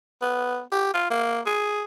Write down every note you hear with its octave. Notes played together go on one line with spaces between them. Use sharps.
B3
G4
F4
A#3
G#4